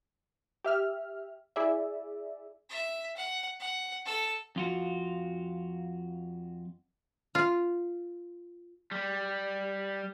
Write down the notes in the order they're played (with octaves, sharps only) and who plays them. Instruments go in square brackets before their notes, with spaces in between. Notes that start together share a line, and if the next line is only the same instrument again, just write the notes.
[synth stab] G4 E5 F6
E4 G#4 D5 E5
[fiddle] E5
F#5
F#5
A4 E6
[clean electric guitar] F2 F4 F#4
[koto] F4
[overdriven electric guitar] G3